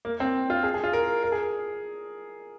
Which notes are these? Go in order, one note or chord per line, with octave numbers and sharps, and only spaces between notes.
A#3
C4
F4
G#4
G#4
F4
A#4
A#4
G#4